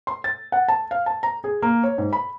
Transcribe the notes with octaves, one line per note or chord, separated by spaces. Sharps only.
C6
A6
F#5
A5
F5
A5
A#5
G#4
A#3
C#5
G#2
B5